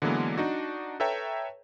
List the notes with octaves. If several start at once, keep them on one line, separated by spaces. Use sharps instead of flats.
D3 E3 F#3 G#3 A#3 B3
D4 D#4 F#4
A4 B4 C#5 E5 G5 A#5